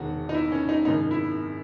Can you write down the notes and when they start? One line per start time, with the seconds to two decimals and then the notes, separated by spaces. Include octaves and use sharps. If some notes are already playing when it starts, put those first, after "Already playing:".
Already playing: E1 E2 D#3 F#4
0.29 D#4
0.34 E4
0.52 C#4
0.69 D#4
0.85 G#1 F#2 D#3 D#4
1.11 E4